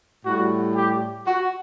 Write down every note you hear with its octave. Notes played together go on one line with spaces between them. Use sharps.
A2 G3 F#4
G4
F#4